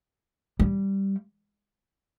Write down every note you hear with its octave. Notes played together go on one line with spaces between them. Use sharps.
G3